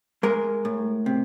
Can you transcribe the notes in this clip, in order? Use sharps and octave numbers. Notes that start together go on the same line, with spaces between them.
G#3 A#4
A2
C3